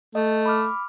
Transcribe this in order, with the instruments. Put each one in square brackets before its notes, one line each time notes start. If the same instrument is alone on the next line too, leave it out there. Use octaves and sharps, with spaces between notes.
[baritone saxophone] A3 [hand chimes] D#5
[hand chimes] B5 D6 F6